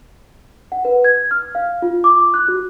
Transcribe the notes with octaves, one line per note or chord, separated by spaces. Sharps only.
F#5
B4
G#6
F6
F5
F4
D6
F#6
F#4